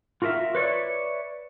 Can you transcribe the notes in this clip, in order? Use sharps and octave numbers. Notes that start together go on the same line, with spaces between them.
F4 F#4 A#4 D#5 E5
B4 C#5 D5 E5